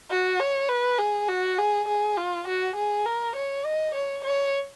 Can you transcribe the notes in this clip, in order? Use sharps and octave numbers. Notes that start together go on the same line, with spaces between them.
F#4
C#5
B4
G#4
F#4
G#4
G#4
F4
F#4
G#4
A#4
C#5
D#5
C#5
C#5